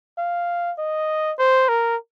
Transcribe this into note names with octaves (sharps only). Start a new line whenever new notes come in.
F5
D#5
C5
A#4